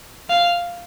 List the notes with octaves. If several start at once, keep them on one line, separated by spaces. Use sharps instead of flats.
F5